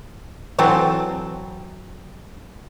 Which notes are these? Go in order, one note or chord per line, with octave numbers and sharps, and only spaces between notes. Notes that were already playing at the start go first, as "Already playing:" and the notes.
E3 F#3 C4 A4